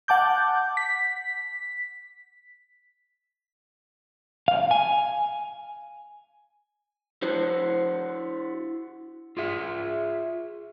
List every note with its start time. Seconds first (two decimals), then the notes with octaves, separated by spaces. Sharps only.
0.08 F#5 A5 D6 G6
0.77 B6
4.48 F5
4.71 G#5
7.22 E4 F#4 C5
9.37 F4 G#4 E5